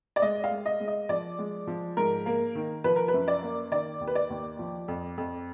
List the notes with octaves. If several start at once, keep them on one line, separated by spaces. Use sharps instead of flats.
D5
G#3 D#5
F5
G#3
D#5
G#3
D#5
F3 D5
G#3
F3
G#2 A#4
A#3
D#3
F3 B4
A#4
B4
F#2
D5
A#3
D#3 D5
D#2
B4
D5
D#2
F3
F2
F2